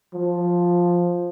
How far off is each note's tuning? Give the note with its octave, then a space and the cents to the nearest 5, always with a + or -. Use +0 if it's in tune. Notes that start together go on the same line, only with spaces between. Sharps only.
F3 +5